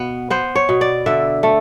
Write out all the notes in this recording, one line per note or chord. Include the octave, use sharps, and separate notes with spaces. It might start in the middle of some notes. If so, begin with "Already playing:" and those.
Already playing: B2 B3
B3 C5
C#5
B2
D5
D3 E5
A3